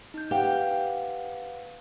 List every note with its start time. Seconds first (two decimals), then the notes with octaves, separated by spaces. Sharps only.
0.14 D#4 G6
0.31 G4 B4 F5 F#5